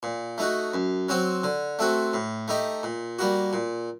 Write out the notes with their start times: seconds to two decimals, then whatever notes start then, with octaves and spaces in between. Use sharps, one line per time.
0.03 A#2
0.38 A3 D#4 F#4
0.74 F#2
1.09 F#3 C4 F#4
1.44 D3
1.79 A3 C4 F#4
2.14 A2
2.48 A3 D#4 G4
2.83 A#2
3.19 G3 A#3 F#4
3.53 A#2